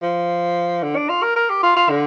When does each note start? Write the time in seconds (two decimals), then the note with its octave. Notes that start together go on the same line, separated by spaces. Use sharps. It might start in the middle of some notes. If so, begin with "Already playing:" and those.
0.02 F3
0.83 D3
0.96 D4
1.09 F4
1.22 A#4
1.36 A#4
1.49 G4
1.63 F4
1.76 F4
1.90 D3